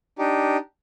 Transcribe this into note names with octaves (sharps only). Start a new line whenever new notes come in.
D4 D#4 G4